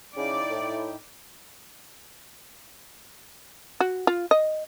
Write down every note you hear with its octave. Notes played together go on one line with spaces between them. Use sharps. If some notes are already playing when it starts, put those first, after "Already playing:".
C#3 D#4 E4 D5 G5
A2
F#4
F4
D#5